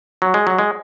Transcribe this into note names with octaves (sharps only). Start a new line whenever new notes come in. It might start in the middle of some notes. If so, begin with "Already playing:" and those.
F#3
G#3
F#3
G#3